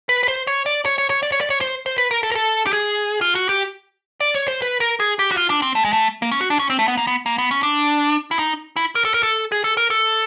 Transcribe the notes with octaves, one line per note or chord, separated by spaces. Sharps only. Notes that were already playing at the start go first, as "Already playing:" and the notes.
B4
B4
C5
C#5
D5
C#5
C#5
C#5
D5
C#5
D5
C#5
C5
C5
B4
A#4
A4
A#4
A4
G4
G#4
F4
F#4
G4
D5
C#5
C5
B4
A#4
G#4
G4
F#4
F4
D4
C4
A3
G#3
A3
A#3
C#4
F#4
D4
C#4
C4
A3
B3
A#3
B3
A#3
B3
C#4
D4
E4
D#4
E4
A#4
A4
A#4
A4
G#4
A4
A#4
A4